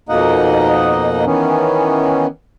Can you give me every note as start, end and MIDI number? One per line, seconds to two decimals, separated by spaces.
0.09 1.25 41
0.09 1.25 47
0.09 1.25 58
0.09 1.25 63
0.09 1.25 75
0.09 1.25 78
1.26 2.27 51
1.26 2.27 52
1.26 2.27 59
1.26 2.27 61